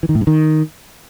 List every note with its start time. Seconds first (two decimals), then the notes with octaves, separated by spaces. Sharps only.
0.03 E3
0.09 D#3
0.15 A2
0.21 G2
0.27 D#3